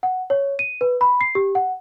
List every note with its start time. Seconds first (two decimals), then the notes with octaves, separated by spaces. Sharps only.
0.03 F#5
0.30 C#5
0.59 D#7
0.81 B4
1.01 B5
1.21 C7
1.35 G4
1.55 F#5